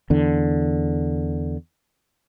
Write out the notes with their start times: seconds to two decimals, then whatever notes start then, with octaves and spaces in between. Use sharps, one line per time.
0.10 E2 D3